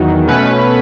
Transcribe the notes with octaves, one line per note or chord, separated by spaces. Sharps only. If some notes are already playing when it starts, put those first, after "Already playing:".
Already playing: E2 D#3 F#3
B2 A3 C#4 B4